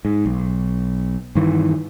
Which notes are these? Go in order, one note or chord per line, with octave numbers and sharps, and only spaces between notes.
G#2
B1
G2 D#3 E3